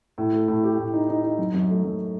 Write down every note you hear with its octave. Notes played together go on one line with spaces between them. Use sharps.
A2
A3
A2
G4
A2
D#4
D#4
D#4
F#2
F#2
A3
F#2